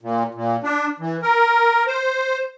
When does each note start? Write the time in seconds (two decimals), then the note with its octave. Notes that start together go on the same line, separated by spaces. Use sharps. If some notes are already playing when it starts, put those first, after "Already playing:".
0.01 A#2
0.34 A#2
0.64 D4
1.00 E3
1.23 A#4
1.87 C5